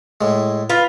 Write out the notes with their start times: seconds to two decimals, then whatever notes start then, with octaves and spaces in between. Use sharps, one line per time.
0.21 A2 G#3
0.69 F4 B4